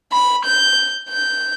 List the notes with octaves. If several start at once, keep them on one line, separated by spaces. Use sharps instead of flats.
B5
G6
G6